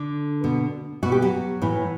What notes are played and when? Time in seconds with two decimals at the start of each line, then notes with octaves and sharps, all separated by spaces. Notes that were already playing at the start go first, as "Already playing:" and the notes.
Already playing: D3 D4
0.44 B2
1.03 B2 F#4
1.12 G4
1.22 F#3 F#4
1.62 A2 E3